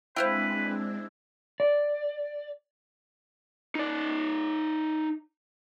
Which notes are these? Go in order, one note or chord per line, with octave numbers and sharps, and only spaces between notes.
G#3 C4 D4 E4 B4 C5 F5 G5
D5
D#4 D5